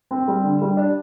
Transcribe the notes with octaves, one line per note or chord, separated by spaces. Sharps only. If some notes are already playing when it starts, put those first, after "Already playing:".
C4
G3
D3
G3
D4